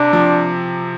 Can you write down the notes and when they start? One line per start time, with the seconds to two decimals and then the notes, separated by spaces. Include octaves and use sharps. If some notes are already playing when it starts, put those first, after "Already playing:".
Already playing: C3 D4
0.13 F3